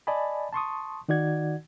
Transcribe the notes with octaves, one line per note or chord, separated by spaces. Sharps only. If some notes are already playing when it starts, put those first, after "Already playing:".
D5 D#5 G#5 A5 B5
A5 C6 C#6 D#6
D#3 D#4 F#4 D5 F#5 G#6